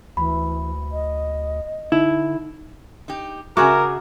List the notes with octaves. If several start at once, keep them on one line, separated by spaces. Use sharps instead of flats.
D2 E3 B5
D#5
D3 D#4 E4
D#4 G4
C#3 F#4 G#4 A#4 E5 G#5 D6